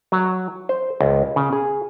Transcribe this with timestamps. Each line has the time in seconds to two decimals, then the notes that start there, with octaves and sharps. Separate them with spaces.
0.12 F#3
0.69 C5
1.01 C#2
1.36 C#3
1.53 G#4